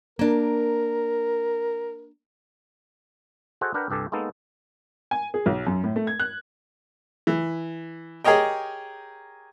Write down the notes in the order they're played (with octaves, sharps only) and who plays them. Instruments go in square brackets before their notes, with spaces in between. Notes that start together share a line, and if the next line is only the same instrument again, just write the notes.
[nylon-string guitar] A#3 D4 [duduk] A#4
[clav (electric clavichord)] F#4 G#4 A4 C5 D#5 F#5
D4 A#4 B4 F#5 G5
C2 G2 G4 A4 G#5
G#3 A#3 B3 D#4 A4
[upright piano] G#5
G#4
B1
F#2
A2
A3
G#6
F#6
[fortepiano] E3
G4 G#4 A#4 C#5 D#5 G5